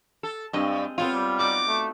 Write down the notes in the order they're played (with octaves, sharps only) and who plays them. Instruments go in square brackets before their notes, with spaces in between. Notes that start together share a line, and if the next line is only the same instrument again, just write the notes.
[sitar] A4
[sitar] G2 [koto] G#3 C4 D#5
[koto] B3 C4 C#5 [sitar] F4
[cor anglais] G3
[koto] D#4 F#4 D5 [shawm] D6
[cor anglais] A3